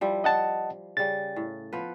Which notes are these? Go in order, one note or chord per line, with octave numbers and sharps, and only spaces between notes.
F3 G3 E4
D#5 F#5 A5
C#3 G3 A6
A2
F3 B3 B4